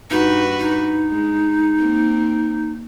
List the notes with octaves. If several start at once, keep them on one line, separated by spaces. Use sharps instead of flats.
G2 D#4 F#4 B4
D#4
G#3
A#3 C4